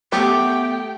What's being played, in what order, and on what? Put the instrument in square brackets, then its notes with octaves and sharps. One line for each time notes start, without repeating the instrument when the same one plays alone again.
[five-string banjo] A3 [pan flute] B3 [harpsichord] G4 [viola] G5